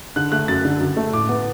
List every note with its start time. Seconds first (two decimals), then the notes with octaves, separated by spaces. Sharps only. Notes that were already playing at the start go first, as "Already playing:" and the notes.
0.16 D3 F#6
0.32 A3 F#6
0.48 F#2 A6
0.65 D3
0.81 F#2
0.97 A3
1.13 A2 D6
1.29 B3